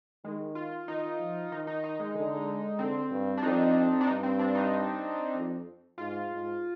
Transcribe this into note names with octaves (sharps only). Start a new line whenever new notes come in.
D#3 G#3
F4
D#3 D#4
F3
D#3 D#4
D#4
D#4
G#3
D3
D3 C4
G2
D4
F2 D#4
D4
G2 D#4
C4
D4
D#4
F2
G#2 F4
G#2